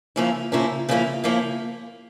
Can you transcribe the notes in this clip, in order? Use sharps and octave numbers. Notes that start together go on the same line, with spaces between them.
C#3 F3 A#3 C#4 E4
C#3 F3 A#3 C#4 E4
C#3 F3 A#3 C#4 E4
C#3 F3 A#3 C#4 E4